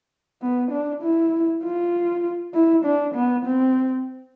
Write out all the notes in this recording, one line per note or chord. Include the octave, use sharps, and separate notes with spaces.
B3
D4
E4
F4
E4
D4
B3
C4